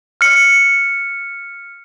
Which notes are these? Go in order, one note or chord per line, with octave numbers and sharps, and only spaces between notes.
F6 C#7